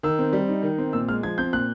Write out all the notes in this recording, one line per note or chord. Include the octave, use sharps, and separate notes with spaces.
D#3 E6
C4
G3
D#4
D#3
C4
A#2 E6
G#3 F6
F3 G#6
C4 G6
A#2 F#6